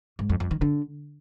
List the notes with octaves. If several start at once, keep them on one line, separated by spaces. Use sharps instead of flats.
G#2
F2
F2
D#3
D3